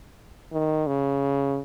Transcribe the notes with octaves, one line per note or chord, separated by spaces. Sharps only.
D#3
C#3